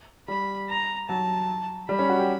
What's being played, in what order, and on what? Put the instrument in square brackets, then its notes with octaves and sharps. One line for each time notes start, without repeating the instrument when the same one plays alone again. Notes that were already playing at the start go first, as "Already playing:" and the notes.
[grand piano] G3 [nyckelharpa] B5
[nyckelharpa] A#5
[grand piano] F#3 [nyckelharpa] A5
[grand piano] G3 [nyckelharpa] B5
[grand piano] C#4
F#4
G4